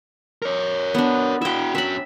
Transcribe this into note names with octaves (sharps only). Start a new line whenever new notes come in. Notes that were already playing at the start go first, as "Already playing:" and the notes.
A#4 C#5
B3 D4
E4 F#4 E5 G5
C#4 F#4 E5 B5